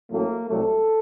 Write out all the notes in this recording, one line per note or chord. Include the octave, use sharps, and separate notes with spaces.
A1 A2 F#3 A3 A#3
C2 C3 F#3 A3 A4